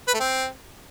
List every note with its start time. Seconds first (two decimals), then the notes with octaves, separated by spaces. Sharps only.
0.08 B4
0.14 A3
0.20 C4